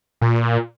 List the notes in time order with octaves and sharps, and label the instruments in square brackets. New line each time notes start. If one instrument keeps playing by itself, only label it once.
[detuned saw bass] A#2